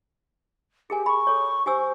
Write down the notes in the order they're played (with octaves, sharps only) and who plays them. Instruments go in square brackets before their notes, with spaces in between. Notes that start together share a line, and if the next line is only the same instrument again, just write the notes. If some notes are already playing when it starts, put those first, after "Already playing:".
[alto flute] G4 [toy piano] G#4 A#4 G#5
[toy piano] G#4 B5 [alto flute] C#6
[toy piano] A4 C#5
[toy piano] G4 G#5 E6 [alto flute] C5